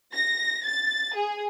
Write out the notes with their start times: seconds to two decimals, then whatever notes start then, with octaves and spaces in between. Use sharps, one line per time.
0.13 A#6
0.64 A6
1.14 G#4